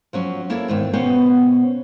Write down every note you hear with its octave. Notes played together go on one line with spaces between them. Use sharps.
F3 F#3 C#4
A#3 E4 A4 C#5 E5
E2 G#2 D#3
B2 B3 C#4 G4 C5 F5